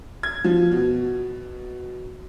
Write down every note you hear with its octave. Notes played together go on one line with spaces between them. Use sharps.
G#6
F3
B2